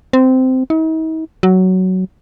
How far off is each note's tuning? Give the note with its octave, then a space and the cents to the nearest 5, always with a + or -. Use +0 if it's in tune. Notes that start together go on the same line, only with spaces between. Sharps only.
C4 -15
D#4 +45
F#3 +10